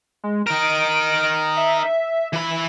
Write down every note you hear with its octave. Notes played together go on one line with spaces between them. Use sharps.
G#3
D#4 A#4 D7
E5
E3 B5